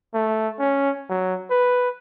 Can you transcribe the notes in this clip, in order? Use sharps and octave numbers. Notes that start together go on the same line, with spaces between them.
A3
C#4
F#3
B4